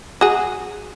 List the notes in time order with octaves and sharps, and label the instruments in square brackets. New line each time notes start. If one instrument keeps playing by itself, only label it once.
[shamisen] F#4 G#4